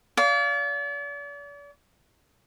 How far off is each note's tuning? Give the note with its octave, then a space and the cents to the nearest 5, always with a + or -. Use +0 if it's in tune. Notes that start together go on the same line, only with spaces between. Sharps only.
D5 -40 F5 +0